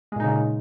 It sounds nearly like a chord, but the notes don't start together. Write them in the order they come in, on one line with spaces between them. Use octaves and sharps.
G#3 A#2 D#4 C#3